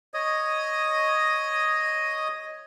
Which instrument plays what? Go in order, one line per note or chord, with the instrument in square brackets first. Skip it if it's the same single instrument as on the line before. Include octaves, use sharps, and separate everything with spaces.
[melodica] C#5 D#5 D#6